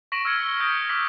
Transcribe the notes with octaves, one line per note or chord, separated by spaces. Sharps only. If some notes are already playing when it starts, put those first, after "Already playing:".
C#6 A#6 B6 D7 E7 F#7
E6 F6 G#6 C#7
E6 B6 C#7 G7
D#6 G6 A#6 D7
D6 E6 B6